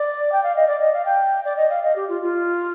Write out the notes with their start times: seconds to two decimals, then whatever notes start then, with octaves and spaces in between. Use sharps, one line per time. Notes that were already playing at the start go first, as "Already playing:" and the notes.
Already playing: D5
0.32 G5
0.43 F5
0.56 D#5
0.67 D5
0.80 D#5
0.93 F5
1.05 G5
1.45 D5
1.57 D#5
1.70 F5
1.84 D#5
1.96 G4
2.09 F4
2.22 F4